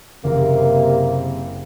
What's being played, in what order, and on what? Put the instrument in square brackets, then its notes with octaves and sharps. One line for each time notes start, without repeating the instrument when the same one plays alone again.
[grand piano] F#1 [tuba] C3 [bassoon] A#3